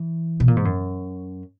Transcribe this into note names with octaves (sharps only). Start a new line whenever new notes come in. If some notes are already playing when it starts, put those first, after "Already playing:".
Already playing: E3
B2
A#2
G#2
F#2